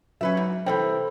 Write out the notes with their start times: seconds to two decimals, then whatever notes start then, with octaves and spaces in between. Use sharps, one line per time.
0.21 F#3 C#4 B4 E5
0.37 G#2
0.66 C3 E3 G3 A4 C5 G5